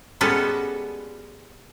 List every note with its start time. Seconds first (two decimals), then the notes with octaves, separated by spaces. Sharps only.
0.21 G3 G#3 B3 C#4 F#4 A4